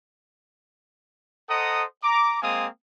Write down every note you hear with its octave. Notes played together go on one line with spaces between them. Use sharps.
A4 C5 D#5 F#5 A#5 D#6
A#5 D6
G#3 A#3 C4 F5 G#5 D#6